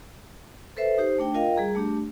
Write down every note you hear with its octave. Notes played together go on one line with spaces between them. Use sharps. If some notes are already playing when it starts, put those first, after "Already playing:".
A4 B4 C5 E5
D#4 G4 C5
A3 D4 G5
F4 A#4 D#5 F5 G5
G3 G#4 A#5
A3 D4 G4